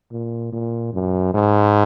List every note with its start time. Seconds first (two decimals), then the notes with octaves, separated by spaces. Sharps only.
0.12 A#2
0.53 A#2
0.94 F#2
1.34 G#2